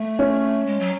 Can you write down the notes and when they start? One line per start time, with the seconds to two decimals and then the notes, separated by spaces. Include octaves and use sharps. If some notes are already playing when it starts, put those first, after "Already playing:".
Already playing: A3
0.19 C#4
0.66 G#3
0.80 F#3